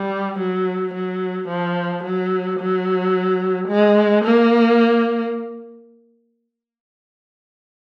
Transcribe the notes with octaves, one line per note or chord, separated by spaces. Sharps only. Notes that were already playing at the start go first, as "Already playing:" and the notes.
Already playing: G3
F#3
F#3
F3
F#3
F#3
G#3
A#3